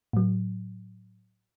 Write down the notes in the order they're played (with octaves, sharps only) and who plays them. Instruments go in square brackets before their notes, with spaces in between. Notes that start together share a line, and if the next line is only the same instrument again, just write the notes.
[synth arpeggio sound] A2 F#3